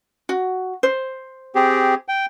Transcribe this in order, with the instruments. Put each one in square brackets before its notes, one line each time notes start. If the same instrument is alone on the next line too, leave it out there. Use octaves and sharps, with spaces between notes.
[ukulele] F#4
C5
[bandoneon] C4 G4 G#4
G5